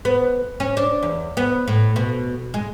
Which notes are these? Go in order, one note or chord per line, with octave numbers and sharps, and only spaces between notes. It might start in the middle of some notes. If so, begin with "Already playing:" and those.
B3
C#4
D4
E2
B3
A2
B2
G#3